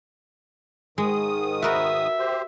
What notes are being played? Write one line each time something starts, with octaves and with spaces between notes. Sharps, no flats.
G#2 D#3 G#3 D#6
F#4 A#4 B4 E5
G4 C5